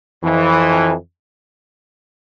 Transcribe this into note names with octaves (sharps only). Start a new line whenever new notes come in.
F2 E3